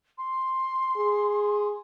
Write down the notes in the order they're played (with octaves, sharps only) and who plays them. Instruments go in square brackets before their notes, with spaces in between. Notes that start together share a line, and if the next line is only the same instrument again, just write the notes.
[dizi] C6
[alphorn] G#4